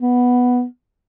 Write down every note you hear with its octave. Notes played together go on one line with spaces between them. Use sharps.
B3